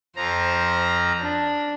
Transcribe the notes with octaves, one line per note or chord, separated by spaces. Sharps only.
F2 F3 C5 A#5
D4